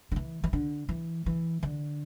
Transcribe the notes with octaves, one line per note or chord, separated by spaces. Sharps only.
D3
E3
E3
D3
E3
E3
D3